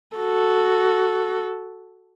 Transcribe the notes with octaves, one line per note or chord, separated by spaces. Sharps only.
F#4 A4